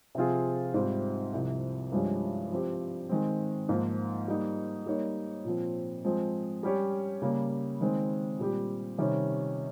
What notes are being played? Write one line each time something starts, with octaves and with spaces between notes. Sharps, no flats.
C3 F3 C4 F4 G#4
G#2 G3 C4 F4
C2 C3 F3
G2 F3 G#3 C#4 G4
F3 C4 G4
D#3 G#3 C4
G#2 F3 A#3 F4
G3 A#3 D#4
G3 A#3 D#4 A#4 C#5
A#2 F3 C4
F3 G#3 C4
G3 C#4 G4 C#5
C#3 G3 A#3
D#3 G#3 C4
A#2 G3 C4 G4
C3 D#3 G3 C#4